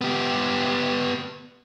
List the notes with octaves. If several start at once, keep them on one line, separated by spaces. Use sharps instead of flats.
B3 G4